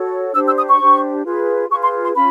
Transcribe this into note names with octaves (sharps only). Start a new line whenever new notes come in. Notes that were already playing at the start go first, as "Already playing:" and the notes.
Already playing: F#4 A4 C#5
D4 G4 C5 E6
E6
D#6
C#6
D4 G4 C5
F4 G#4 B4
F4 G#4 B4 C#6
C6
C6
C#4 F4 B5